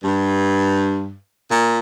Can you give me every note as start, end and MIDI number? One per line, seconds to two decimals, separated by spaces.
0.03 1.15 43
1.49 1.77 46